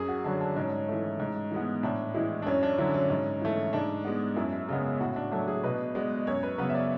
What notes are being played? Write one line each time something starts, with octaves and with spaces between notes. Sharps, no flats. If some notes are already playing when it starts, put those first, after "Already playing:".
Already playing: F#2 G#4
F#4
D3 F#3 D4
D4
G#2 C#4
E3 A3
G#2
E3 G#3 B3
A2 D4
E3 G#3 E4
D4
F#2 C#4
D4
D3 F#3 E4
C#4
G#2
E3 A3
G#2 D4
G#3 B3
F#2 E4
C#3 G#3 B3
A2 F#4
D4
F#3 A3 D4
G#4
B2 B4
G#3 B3 D5
F#2 C#5
B4
C#3 F#3 B3 B4
E5
D5